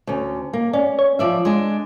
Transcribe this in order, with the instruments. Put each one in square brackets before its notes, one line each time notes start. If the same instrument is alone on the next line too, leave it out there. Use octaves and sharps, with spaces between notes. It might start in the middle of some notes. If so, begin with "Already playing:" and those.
[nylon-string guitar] D2 C#4
A#3
[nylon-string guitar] C#4 [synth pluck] D5
[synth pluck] C#5
[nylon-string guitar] F3 D5 E5
G#3 D4